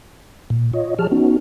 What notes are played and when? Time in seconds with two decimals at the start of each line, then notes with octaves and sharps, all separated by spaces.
0.50 A#2
0.73 F4 C#5 D#5
0.99 F3 G4 G#4 C#5 A5 F6
1.12 B3 C#4 D#4 F#4